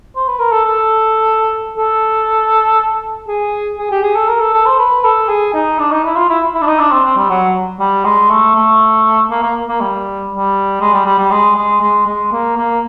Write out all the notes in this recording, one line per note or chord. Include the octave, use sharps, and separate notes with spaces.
C5
B4
A#4
A4
A4
A4
G#4
G#4
G4
G#4
A4
A#4
A4
A4
C5
B4
A4
G#4
D#4
D4
D#4
E4
F4
E4
E4
D4
D#4
D4
C4
C4
G3
F#3
G3
G#3
A3
A3
A#3
A#3
A#3
G3
G3
G#3
G3
G3
G3
G#3
G#3
G#3
G#3
A#3
A#3